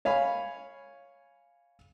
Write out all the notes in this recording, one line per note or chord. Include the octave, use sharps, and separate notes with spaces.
C#5 F5 G#5 B5